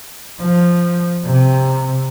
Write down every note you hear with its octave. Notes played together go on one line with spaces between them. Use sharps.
F3
C3